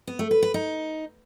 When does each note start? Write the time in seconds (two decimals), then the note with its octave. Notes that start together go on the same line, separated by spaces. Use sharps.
0.07 B3
0.19 A3
0.31 B4
0.43 B4
0.54 D#4